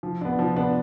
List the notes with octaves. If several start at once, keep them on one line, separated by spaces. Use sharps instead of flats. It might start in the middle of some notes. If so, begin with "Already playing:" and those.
F3
B3 D4
F3
B3 D4